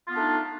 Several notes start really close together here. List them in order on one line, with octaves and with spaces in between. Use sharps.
F4 B3 D4 A3 D#4